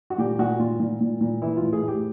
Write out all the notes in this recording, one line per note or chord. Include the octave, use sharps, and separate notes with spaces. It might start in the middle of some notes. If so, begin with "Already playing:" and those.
F#4
A#2 G4
A#2 F#4
A#2 F4
A#2
A#2
A#2
E3 E4
A2 F4
G#4
A2
G4